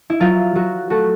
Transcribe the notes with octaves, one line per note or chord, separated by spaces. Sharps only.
E4
F#3 F4
F#3 F#4
A3 F#4